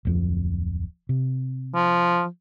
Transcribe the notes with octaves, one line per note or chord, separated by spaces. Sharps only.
D1 F2 F3
C3
F3